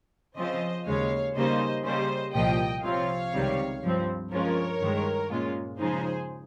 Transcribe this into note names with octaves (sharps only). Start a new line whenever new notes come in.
C#3 F3 C4 F4 C5 D#5
D#2 C#3 G#3 C#5 F5
C#3 G3 A#3 D#4 C5 D#5
C#3 G3 A#3 C5 D#5
C2 A#2 F3 D#5 G5
C3 F3 C4 F4 C#5 F5
C#2 C3 D#3 G3
G2 F3 C4
G2 F3 G#3 C#4 F4 A#4 C#5
G2 D#3 G#3
A#2 G#3 C#4 F4
C#3 F3 G#3 D#4 G#4 C5